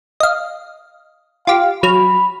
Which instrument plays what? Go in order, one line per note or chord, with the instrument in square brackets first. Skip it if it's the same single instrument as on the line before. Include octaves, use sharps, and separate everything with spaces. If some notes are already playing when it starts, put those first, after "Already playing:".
[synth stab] D#5 F5
[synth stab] F4 G4 [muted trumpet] F5
[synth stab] F#3 F6 [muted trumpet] B5